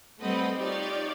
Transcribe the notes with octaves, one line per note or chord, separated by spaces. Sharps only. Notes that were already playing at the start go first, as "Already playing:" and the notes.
G3 A3 C4 B4 D#5 F#5
D#4 F4 G4 C#5 D5